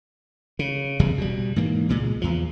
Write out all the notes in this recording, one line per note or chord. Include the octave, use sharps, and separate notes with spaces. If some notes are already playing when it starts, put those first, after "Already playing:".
C#3
F1 E2 C#3 G3
B2 G3
G#2 E3 A#3
C#2 A#2 G#3
E2 F3